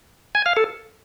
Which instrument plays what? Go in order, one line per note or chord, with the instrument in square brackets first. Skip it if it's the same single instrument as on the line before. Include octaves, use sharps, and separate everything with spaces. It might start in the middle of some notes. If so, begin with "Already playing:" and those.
[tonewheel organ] G#5
F5
A4